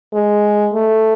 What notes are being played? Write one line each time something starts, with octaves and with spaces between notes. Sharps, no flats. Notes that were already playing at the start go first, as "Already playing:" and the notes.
G#3
A3